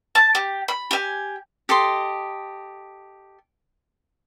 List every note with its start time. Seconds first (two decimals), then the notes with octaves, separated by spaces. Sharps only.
0.15 A5
0.35 G4
0.68 B5
0.91 G4 G#5
1.69 G4 A4 D#5 C6